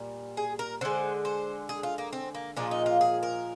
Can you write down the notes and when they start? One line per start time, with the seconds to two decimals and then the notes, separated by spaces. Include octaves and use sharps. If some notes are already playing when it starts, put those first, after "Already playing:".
Already playing: A#2 G3
0.37 G#4
0.59 A#4
0.81 D3 G#3 C5
1.25 C5
1.69 G#4
1.83 F4
1.98 A#3
2.13 C4
2.35 A#3
2.57 A#2 F3 G#3 D4
2.71 D#4
2.86 F4
3.01 G#4
3.23 A#4